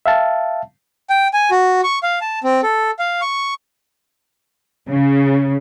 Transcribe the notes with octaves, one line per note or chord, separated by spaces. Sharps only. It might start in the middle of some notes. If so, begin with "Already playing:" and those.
E5 F5 A5
G5
G#5
F#4
C#6
F5
A5
C4
A4
F5
C#6
C#3